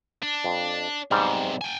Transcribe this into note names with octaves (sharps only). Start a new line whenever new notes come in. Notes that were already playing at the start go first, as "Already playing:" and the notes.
D4
F2
B1 G#2 C3 G3
G5 G#5